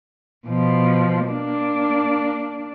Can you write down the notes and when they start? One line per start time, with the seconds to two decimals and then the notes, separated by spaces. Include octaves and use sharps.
0.47 B2 F3
1.27 A#3 D4